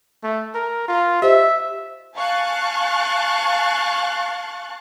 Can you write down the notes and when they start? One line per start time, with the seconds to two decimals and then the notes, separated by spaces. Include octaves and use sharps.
0.23 A3
0.54 A#4
0.88 F4
1.22 G4 C5 D#5 E5
2.16 F5 G#5 A5 C#6 F#6 A6